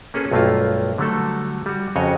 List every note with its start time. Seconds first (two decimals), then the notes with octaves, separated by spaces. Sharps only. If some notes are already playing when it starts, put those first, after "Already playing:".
0.14 A#3 C#4 G#4 A4 B4
0.32 B1 G2 A3 A#3 F4
0.98 D3 F#3 G3 A3 F#4 A4
1.66 G3 F#4
1.96 F2 C#3 F#4 C#5 D#5